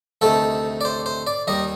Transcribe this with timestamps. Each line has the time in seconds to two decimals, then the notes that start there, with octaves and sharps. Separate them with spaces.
0.21 D2 C3 D#3 A3 A4
0.81 D5
0.85 C5
1.06 C5
1.27 D5
1.47 D#2 D#3 G3 D#5